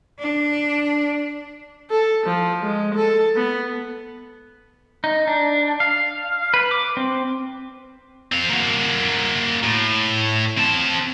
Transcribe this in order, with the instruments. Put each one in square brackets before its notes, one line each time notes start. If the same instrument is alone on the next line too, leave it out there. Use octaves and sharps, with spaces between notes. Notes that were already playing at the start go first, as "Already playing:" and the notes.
[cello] D4
[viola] A4
F3
G#3
A4
B3
[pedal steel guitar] D#4
D4
F5
B4
D6
C4
[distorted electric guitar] C4 F5
A#3 F#4
A2
C4 A5